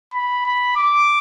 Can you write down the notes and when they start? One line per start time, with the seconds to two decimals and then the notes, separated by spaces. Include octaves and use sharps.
0.13 B5
0.45 B5
0.76 D6